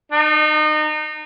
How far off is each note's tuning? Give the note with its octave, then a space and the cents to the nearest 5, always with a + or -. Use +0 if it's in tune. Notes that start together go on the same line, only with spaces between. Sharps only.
D#4 -30